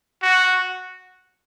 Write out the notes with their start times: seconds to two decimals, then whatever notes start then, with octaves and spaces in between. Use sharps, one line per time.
0.23 F#4